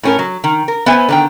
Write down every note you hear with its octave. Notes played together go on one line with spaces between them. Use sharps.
A2 C#4 A#4
F#3
D#3
A#4
B3 C5 E5 G#5
D3 D#3 G5